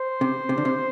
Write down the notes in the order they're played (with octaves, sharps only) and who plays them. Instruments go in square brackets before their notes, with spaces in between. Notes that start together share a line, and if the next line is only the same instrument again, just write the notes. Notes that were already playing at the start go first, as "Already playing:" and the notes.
Already playing: [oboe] C5
[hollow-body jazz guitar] C3
C3
D3
C3